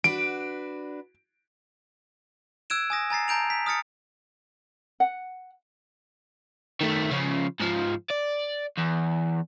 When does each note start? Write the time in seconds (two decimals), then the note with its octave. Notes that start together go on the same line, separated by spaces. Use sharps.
0.04 D4 F#4 B4 D7
2.70 E6 F#6 G#6 D7 E7
2.90 G#5 D#6 A#6
3.10 G#5 A#5 A6 C7
3.28 A5 A#5 G6 D7 F7
3.50 B6
3.66 D#6 F6 A6 C#7
5.00 F#5
6.81 D#3 A3
7.11 C#3 F3
7.60 G#2 F3
8.10 D5
8.77 E2